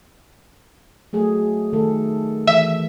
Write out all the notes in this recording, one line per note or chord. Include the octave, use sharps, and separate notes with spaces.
F#3 A3 G#4
D#3 A3 A4
E3 E5